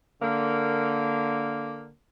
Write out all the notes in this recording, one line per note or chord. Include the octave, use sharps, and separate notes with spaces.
D3 A#3